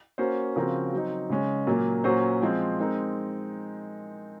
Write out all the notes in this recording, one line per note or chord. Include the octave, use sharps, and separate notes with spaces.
A#3 C#4 F#4 C5
C#3 F3 C4 F#4 A#4
F#3 C4 D#4
C#3 G#3 C#4
A#2 F#3 A#3
A#2 F#3 C#4 F#4 C5
F3 G#3 C4
G#3 C4 D#4 A#4